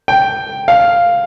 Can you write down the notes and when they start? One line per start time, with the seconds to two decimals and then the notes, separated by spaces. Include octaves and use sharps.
0.08 G5
0.68 F5